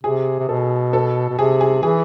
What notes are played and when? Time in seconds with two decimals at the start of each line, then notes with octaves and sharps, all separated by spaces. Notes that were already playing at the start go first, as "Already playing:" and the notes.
0.03 C3 G#4
0.39 C3
0.49 B2 A4
0.93 A4
1.29 B2
1.39 C3 G#4
1.61 G#4
1.83 E3 G#4